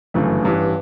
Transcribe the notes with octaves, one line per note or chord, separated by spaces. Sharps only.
G1 F#2 C#3 E3 A3
A1 G2 E3